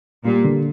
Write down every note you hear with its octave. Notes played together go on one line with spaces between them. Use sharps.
A#2 G3
D3